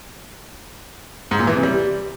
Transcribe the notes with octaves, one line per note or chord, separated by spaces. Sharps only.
G#2
A#2
E3
C3
G3